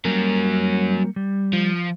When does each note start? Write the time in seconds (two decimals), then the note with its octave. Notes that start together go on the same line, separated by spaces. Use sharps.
0.05 F#3 G3 A#3 C#4 A#4
1.16 G3
1.53 F3